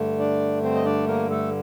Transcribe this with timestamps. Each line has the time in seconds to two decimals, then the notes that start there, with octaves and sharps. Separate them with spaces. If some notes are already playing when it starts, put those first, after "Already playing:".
Already playing: G2 D3 A3
0.19 D4 D5
0.63 C4 C5
0.75 D#5
0.85 D4 D5
1.08 A#3 A#4
1.30 A3 A4